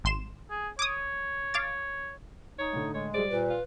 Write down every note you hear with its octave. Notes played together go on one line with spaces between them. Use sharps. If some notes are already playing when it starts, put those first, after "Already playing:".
G#1 C6 E7
G#4
C#5 D6 D#6
F5 D6 A6
D#4 C#5
A2 D3
G#3 C#5
G3 G#4 C5 D5
A#2 B4
F4